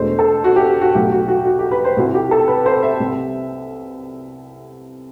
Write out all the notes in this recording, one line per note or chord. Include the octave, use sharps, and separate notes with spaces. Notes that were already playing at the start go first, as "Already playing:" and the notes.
Already playing: E1 E2 B2 A3 C5
A4
F#4
G4
F#4
B1 A2 F#3 G4
F#4
F#4
F#4
G4
B4
C5
C2 C3 G3 C4 E4 F#4
G4
A4
B4
C5
E5
C2 C3 G3